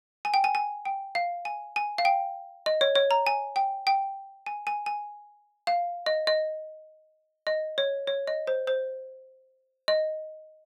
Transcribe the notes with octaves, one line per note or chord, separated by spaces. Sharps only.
G#5
G5
G#5
G#5
G5
F5
G#5
G#5
F5
G5
D#5
C#5
C#5
A#5
G#5
G5
G5
G#5
G#5
G#5
F5
D#5
D#5
D#5
C#5
C#5
D#5
C5
C5
D#5